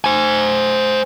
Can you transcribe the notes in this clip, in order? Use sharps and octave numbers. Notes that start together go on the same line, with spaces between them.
C5 G#5